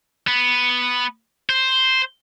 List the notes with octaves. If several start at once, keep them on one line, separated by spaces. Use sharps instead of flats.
B3
C5